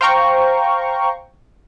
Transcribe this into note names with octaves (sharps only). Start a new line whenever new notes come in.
C5 F5 G5 A#5 C#6